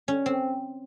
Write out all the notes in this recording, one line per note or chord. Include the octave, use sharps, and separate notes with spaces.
C#4
C4